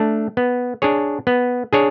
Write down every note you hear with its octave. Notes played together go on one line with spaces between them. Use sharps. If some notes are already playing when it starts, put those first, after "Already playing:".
Already playing: A3 D4
B3
D4 G#4 C#5
B3
D4 G#4 C#5